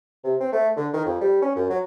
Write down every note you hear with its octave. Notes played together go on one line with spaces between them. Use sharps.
C3
C4
A3
D3
D#3
F2
G3
C#4
F#2
F#3